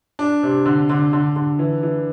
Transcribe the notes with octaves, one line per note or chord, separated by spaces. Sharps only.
D4
C3
D3
D3
D3
D3
E3
E3